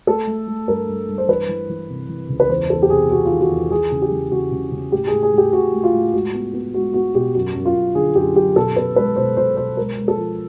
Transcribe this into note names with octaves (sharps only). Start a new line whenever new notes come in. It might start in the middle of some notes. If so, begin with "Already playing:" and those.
A3 A4
A3
A3
G2 A#4
G2
G2
C5
E3 B4
E3
E3
C3
E3
C#2
B4
E2 C5
E2 A4
G4
C3 G#4
C3 F#4
F4
D#3
F#4
E2
E3 G#4
C#3
G4
E3
C#3 F#4
C#3
C#3
A2 G4
A2 G#4
G#4
A2 G4
A2 F#4
A3
F4
A2
G#3 F#4
B3
B3
G#3 F#4
B3 F#4
B2 G4
F#2 F#4
F#2
F4
F#2
D3 G#4
F#2 G4
F#2 G4
B2 A4
B2 B4
G#3 B4
B2 C5
B2 C5
B2 C5
G#3 A#4
G#3
A4
F3